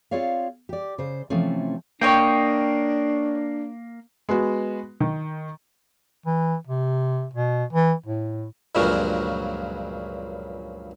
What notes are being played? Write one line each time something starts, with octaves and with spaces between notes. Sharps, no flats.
C4 F4 G#4 C#5 D5 F5
G4 D5
C#3 C5
C3 E3 F3 A3 C4 C#4
A#3 D4 C#5 D#5 G5
G#3 B3 F#4
D#3
E3
C3
B2
E3
A2
C#2 G2 A#2 C#3 F3 F#3